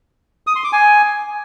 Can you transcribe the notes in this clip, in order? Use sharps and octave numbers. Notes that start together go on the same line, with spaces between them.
D#6
C6
D6
G#5